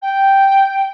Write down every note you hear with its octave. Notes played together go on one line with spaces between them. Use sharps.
G5